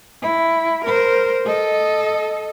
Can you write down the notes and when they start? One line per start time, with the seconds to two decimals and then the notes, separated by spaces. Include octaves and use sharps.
0.22 E4
0.85 A#4 C5
1.46 A4 D#5